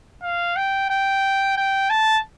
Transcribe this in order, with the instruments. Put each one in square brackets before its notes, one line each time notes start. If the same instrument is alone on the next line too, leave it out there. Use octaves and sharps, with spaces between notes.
[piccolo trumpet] F5
G5
G5
G5
A5